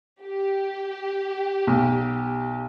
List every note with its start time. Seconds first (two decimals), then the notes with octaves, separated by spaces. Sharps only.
0.22 G4
1.67 B1